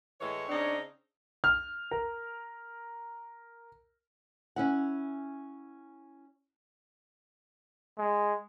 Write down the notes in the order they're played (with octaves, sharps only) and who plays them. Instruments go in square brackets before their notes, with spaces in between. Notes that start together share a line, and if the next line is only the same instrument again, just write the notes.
[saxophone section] A2 E3 G#3 [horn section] C#5
[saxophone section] C#3 C4 D#4 [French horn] D4
[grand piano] F6
A#4
[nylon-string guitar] C#4 E4 F#5
[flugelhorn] G#3